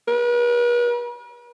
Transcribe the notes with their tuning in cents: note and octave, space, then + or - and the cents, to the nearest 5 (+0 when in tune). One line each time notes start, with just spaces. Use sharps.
B4 -45